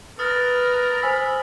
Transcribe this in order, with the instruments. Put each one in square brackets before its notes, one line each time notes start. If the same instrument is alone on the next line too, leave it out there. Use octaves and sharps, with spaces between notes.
[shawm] A#4 [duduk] B4 [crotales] D#6 F6 A6
[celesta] C5 G#5 E6 [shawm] B5